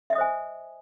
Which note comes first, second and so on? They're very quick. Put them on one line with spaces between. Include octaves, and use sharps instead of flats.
E5 D#5 D#6 C5 G#5